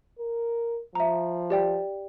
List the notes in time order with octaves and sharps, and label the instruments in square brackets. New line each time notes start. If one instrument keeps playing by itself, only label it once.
[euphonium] A#4
[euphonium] F3 [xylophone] E5 A#5
[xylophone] G4 D5 G5